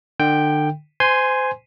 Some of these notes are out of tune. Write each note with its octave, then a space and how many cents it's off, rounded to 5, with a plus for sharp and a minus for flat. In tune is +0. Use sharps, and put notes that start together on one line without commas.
D3 +35 G5 +0
C5 -25 G#5 +0 C6 +0